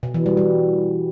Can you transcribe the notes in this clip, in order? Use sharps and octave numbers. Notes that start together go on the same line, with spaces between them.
B2
E3
G3
G3